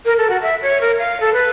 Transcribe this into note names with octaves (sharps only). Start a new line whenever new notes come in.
A#4
A4
F#4
E5
C#5
A#4
F5
A4
B4